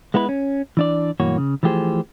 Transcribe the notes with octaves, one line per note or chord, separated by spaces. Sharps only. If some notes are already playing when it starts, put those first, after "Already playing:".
G#3 B3 E4 B4
C#4
E3 D4 D5
B1 G2 E3 A#3 F#4 C#5
C#3
E3 F3 A3 G4 G#4 C5